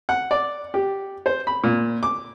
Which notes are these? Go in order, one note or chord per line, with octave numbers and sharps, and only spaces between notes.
F#5
D5
G4
C5
B5
A#2
D6